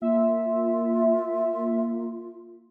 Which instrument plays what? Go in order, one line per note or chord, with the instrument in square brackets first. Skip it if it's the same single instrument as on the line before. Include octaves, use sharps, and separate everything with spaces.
[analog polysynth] A#3 [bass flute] F4 [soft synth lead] E5